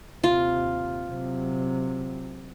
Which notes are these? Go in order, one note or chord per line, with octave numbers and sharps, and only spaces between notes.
D#2 C3 F4
C3 F#3